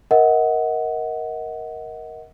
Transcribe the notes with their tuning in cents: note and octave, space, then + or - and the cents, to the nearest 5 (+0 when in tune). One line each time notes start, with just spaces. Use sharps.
A#4 +10 D#5 +35 F#5 +0